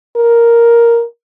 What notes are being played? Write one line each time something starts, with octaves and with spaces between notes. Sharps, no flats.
A#4